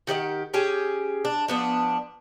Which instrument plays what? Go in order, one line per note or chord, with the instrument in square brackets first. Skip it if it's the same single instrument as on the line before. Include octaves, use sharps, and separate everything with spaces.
[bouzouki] D#3 G4 D5 F#5
C#4 G4 G#4
D4
F3 B3 D4